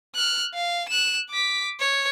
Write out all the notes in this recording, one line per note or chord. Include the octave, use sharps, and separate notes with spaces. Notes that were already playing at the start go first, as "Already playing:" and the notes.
F6 F#6
F5
F#6 E7
D6 B6
C#5